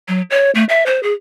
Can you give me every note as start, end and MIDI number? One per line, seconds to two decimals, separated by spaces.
0.08 0.22 54
0.30 0.51 73
0.55 0.64 57
0.69 0.84 76
0.86 1.02 72
1.03 1.13 68